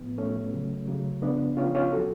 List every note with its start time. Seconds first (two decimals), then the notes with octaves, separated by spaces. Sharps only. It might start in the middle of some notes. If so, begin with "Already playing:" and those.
Already playing: A2 F3 B3
0.18 A2 F3 A3 C#4
0.52 C#3 F#3
0.87 C#3 F#3
1.22 C#3 F3 B3 D4
1.57 C#3 F3 C#4 F4
1.75 C#4 F4
1.92 B2 F#3 F#4 A4